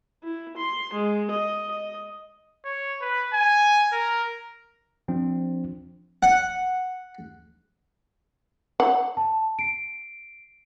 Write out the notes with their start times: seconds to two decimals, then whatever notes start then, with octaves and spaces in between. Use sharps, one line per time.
0.24 E4
0.57 C6
0.93 G#3
1.31 D#5
1.71 D#5
2.64 C#5
3.01 B4
3.33 G#5
3.92 A#4
5.08 F3 C4 D4
6.23 F#5
8.80 F#5
9.17 A5
9.59 C7 D7